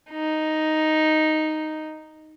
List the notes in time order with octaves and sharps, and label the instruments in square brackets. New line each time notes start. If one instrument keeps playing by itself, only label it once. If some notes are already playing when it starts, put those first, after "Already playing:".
[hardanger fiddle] D#4